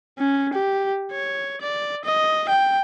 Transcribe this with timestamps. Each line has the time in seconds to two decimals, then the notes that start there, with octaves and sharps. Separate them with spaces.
0.19 C#4
0.54 G4
1.12 C#5
1.61 D5
2.05 D#5
2.49 G5